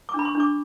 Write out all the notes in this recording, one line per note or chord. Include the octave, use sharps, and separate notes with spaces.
D6
D4 B5
C#6
D4
D6